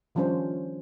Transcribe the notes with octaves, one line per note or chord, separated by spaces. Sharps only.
D#3 F3 G3 C#4 D4 C5